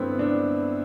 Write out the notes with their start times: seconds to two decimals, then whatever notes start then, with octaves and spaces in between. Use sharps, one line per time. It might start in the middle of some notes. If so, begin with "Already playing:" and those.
Already playing: G2 D3 B3 C4 E4
0.19 D4